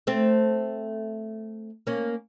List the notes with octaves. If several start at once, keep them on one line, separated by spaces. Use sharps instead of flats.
A3 C4
A#3 C#4